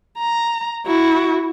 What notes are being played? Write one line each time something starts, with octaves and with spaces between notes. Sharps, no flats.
A#5
E4 F#4